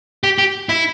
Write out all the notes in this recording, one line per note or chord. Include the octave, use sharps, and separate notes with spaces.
G4
G4
E4